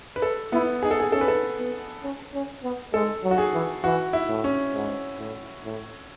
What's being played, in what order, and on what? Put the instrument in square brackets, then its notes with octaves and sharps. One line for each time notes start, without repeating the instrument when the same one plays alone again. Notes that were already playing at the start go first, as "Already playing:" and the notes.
[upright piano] B4
A4
[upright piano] B3 [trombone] E4
[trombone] D#4 [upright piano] G#4
[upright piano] A4
G#4
[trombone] C#4 [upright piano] A4
[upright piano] B4
A4
[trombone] B3
C#4
C#4
B3
[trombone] G#3 [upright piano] A4
[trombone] F#3
[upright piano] F#4
G#4
[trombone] E3
[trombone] E3 [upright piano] F#4
[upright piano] E4
[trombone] A2
[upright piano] C#4
[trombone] G#2
A2
A2